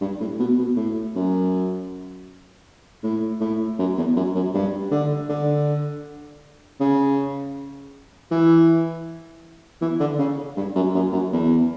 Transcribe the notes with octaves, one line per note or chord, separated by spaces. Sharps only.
G2
A2
B2
B2
A2
F#2
A2
A2
F#2
E2
F#2
F#2
G2
D3
D3
C#3
E3
E3
D3
C#3
G2
F#2
F#2
F#2
E2